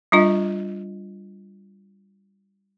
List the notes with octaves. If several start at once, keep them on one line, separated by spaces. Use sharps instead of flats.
G3 D4 F4 D#5